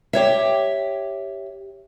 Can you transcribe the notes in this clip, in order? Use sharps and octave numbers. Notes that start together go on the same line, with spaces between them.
G4 C#5 E5